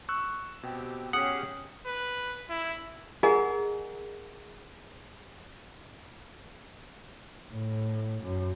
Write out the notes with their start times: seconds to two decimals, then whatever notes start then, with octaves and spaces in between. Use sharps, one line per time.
0.09 C#6 E6 F#6
0.63 B2 C4 G4
1.13 C#4 G4 G#4 F#5 D#6
1.86 B4
2.49 E4
3.23 G#4 A#4 D#5 F#5 G#5 A#5
7.51 A2
8.23 F#2